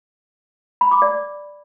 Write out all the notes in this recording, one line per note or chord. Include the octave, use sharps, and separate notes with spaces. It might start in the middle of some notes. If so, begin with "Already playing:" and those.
B5
D6
D5